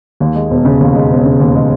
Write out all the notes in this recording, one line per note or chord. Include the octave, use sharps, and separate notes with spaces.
D#2
G#3
E1
C#3
D#2
G#3
E1
C#3
D#2
G#3